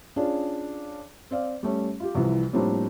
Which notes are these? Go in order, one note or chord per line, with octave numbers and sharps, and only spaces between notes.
C#4 D4 F4 G#4 D5
C4 D5 F5
G3 A3 C#4
F4 G4
C2 C3 E3 F3
A2 F3 G3 A#3 C4 D4